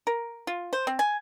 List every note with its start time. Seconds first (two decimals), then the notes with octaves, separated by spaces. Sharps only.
0.07 A#4
0.47 F4
0.73 C5
0.87 C4
0.99 G#5